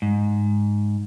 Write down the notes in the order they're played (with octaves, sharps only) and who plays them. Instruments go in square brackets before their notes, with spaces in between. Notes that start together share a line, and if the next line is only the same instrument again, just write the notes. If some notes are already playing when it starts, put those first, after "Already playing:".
[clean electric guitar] G#2